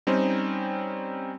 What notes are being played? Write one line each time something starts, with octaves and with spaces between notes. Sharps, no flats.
G3 C4 C#4 D#4 C5